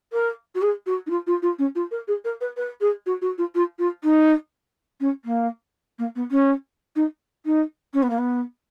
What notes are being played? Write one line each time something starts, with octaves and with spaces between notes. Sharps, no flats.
A#4
F#4
G#4
F#4
D#4
F4
F4
F4
C#4
F4
A#4
G#4
A#4
B4
B4
G#4
F#4
F#4
F4
F4
F4
D#4
C#4
A#3
A#3
B3
C#4
D#4
D#4
C#4
B3
A#3
B3